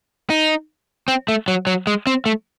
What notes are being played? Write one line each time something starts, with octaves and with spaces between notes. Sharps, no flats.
D#4
C4
A3
F#3
F#3
G#3
C4
A3